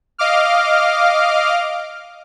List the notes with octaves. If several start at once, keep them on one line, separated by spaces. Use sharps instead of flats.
D#5 F5 D6 F6